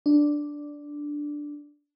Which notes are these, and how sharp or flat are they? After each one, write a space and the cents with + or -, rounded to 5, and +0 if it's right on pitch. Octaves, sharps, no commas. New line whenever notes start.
D4 +0